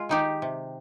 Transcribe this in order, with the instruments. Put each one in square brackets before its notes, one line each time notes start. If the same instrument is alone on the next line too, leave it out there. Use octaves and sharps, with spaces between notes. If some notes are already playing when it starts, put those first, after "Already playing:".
Already playing: [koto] G#3 F4
D#3 D#4 G4
C3